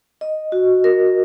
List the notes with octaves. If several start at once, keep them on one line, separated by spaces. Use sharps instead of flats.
D#5
F#4
A#4